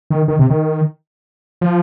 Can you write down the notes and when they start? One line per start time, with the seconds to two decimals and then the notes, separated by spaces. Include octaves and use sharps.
0.10 D#3
0.28 D#3
0.39 C3
0.50 D#3
1.61 F3